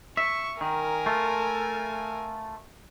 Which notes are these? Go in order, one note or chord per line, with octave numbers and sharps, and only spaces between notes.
E5 C#6
D#3 A#4 G#5
A3 F4